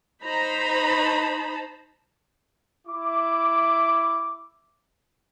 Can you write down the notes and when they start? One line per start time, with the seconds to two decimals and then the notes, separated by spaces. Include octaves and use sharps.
0.23 D#4 C5 A#5 B5
2.88 E4 D6